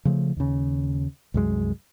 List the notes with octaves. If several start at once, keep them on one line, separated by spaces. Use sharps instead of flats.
C#3 F3 A3
D#2 C#3
C2 F#2 G#3